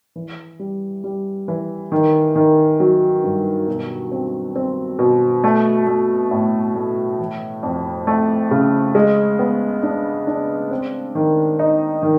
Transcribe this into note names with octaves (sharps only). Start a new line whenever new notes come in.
E3
G3
G3
E3
D#3
D#3
F#3
G2
B2
C4
C4
B2
A3
A3
A2
A3
E3
F2
A3
C#3
G#3
B3
D4
D4
C4
D#3
D#4
D#3